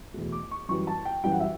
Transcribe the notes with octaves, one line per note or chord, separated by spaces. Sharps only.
E2 B2 A3
D6
C#6
F#2 E3 G3 C#6
A5
G5
F#2 E3 G3 G5
F#5
E5